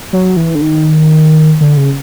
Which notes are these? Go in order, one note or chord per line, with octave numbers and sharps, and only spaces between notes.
F#3
E3
D3
D#3
D3
C#3